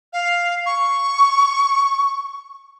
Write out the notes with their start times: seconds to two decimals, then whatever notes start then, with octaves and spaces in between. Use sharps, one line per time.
0.13 F5
0.66 C#6